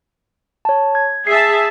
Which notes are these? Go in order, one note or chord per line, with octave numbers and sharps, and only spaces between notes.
C#5 A5
G#6
G#4 E5 A5 C7